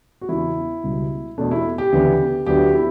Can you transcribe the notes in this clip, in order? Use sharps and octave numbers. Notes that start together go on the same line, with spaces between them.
F#4
E2 C#3 E3 E4
C#2 B2 G3
E2 B2 A3 D4
E4
G4
D2 C#3 E3 B3
D2 D3 F#3 B3 G4
E4